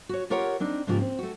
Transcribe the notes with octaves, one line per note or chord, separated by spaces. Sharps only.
F#4 C#5
F4 G4 A#4 C#5 F5 F#5
C4 D4 D#4
G#2 C#3 F3 A#3 F4 G4
C4
A3 F#4